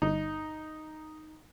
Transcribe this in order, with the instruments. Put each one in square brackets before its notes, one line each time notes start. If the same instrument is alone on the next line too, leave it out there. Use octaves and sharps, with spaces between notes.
[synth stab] G1 [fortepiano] D#4